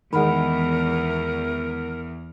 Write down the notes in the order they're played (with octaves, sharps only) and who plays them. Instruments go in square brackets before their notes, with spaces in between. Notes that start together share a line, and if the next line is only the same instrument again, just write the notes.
[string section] E2 [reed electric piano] D#3 G#3 [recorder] A#4 [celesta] F#5 B5